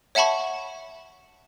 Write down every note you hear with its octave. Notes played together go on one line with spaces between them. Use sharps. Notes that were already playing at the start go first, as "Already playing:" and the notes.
C#5 E5 F#5 A5 B5 C#6